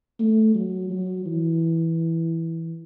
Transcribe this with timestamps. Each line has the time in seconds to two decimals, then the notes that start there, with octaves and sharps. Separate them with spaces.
0.20 A3
0.55 F#3
0.90 F#3
1.26 E3